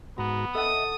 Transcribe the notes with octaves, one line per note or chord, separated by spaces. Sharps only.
G#2 B3 F#4 A#5
A4 D#5 E5 F#5 D#6